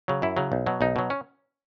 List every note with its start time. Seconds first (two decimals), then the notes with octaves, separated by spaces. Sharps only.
0.08 C#3 F#3
0.22 F#2 E4
0.37 C#3 F#3
0.52 B1
0.66 B2 F#3
0.81 B1 D#4
0.96 B2 F#3
1.10 C#4